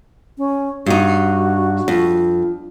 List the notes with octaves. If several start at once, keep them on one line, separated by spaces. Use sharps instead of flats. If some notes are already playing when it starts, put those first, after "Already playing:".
C#4
G2 D#4 F#4
F2